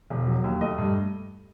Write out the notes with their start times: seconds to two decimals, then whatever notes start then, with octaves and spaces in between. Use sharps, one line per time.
0.10 E1
0.27 F#3
0.44 D#2
0.61 A3 D#5
0.78 G2